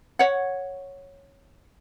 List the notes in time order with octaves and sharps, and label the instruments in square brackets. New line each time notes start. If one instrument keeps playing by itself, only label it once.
[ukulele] C#5 F#5